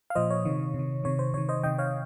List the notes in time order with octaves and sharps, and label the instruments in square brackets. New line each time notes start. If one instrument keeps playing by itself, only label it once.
[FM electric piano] F5
A#2 F3 C5 D#5
C#5
C3 D#3
C3 D#3
C3 D#3 C#5
C5
C3 D#3 C#5
C5 D#5
C3 D#3 D#5 G5
C#5 F5